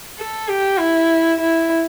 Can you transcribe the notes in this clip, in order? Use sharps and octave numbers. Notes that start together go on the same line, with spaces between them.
A4
G4
E4
E4